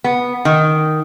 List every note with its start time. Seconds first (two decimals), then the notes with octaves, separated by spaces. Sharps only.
0.04 B3
0.45 D#3